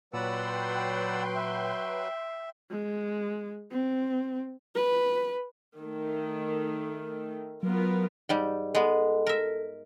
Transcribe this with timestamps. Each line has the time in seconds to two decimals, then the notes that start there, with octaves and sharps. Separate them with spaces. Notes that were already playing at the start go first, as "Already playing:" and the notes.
0.13 A#2 F#3 B4 D5 F#5 G5 C6 E6
1.35 E5
2.71 G#3
3.71 C4
4.75 B4
5.78 D#3 A3
7.63 F#3 B3 F4 A#4
8.29 G#2 G3
8.75 G#3 B3 A4
9.27 A#4 E5